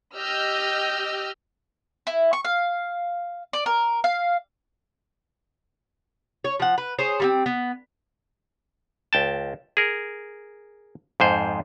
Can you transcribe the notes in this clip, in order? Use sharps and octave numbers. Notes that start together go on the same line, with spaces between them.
G4 D#5 E6 F6 G6
E4
C#6
F5
D5
A#4
F5
C#5
F3 F#5
B4
G#4 C5 C#5
G3 A#3 C4
B3
C#2 G5 A5
G#4 A#4
F2 G#2 C5